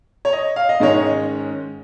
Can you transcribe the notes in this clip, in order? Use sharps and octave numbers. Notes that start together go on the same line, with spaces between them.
C#5
D#5
F5
D#5
G#2 D#3 G#3 C#4 C#5
D#5